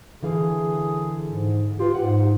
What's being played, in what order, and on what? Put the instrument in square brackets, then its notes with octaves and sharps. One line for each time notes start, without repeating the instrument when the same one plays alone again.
[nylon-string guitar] D3 E3 F5 [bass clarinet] G#4
[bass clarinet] G#2
[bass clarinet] F4 [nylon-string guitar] G4 B4
[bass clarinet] G#2 [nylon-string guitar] F#5